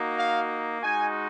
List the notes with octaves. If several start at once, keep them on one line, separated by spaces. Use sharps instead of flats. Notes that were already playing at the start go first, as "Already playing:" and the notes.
Already playing: A#3 D#4 F#4
F5
G#3 D#4 F#4 G#5